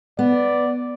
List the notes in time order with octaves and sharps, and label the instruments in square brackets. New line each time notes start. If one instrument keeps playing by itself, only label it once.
[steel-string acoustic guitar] B3 [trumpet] D5